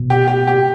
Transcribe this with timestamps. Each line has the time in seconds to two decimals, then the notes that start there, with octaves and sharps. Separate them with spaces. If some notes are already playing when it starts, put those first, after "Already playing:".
Already playing: B2
0.10 G4
0.28 G4
0.47 G4